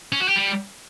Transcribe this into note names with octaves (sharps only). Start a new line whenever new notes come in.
C#4
F#4
G4
G3